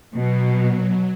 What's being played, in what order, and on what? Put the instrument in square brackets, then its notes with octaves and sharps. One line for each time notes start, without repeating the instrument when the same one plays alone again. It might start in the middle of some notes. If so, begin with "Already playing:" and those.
[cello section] B2 [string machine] F#3